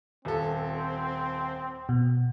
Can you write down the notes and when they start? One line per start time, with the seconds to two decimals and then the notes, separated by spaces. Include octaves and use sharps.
0.25 D#1 C4 A4
1.89 B2